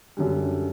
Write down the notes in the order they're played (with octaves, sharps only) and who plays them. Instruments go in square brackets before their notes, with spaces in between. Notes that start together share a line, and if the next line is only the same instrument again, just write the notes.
[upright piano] F#2 D3 G3